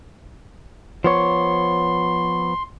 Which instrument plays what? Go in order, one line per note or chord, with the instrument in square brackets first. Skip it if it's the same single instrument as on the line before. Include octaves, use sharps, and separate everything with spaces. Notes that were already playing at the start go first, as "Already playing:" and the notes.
[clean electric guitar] F3 B3 C#5 [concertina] C6